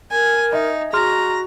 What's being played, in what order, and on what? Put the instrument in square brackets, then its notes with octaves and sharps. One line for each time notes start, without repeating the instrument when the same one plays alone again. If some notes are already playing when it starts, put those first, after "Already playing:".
[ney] A#4 [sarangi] G#5
[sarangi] D#4 [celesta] D#5 E5
[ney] F#4 [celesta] G#4 C6 F6 [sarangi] A#5